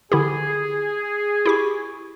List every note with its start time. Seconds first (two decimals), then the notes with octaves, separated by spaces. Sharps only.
0.12 D3 E4 G4 G#4
1.46 E4 G4 C#6